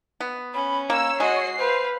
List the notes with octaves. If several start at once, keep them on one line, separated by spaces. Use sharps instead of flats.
B3
C#4 B5
A#3 C#5 E6
G#3 F#4 D#5 C7
B4 C5 F5